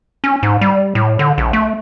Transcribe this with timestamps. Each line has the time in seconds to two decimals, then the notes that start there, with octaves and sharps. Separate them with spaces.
0.24 C#4
0.43 G#2
0.61 G3
0.95 A2
1.19 D3
1.38 A#1
1.53 A3